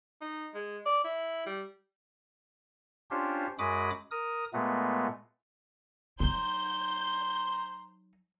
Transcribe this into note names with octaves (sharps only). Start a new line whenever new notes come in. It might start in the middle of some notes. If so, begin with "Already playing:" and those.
D#4
G#3
D5
E4
G3
C#4 D4 F4 G4 C5
F#2 G#3 F#4 B5 D6 D#6
A#4 D#6
A#2 G#3 A3 B3
F#3 D#4 C5 A#5 C6 G6